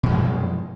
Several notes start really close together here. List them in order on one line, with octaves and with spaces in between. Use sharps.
B2 F3 F#2 G#3